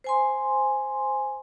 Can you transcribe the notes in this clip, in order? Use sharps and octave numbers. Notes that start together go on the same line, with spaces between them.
C5 G#5 C6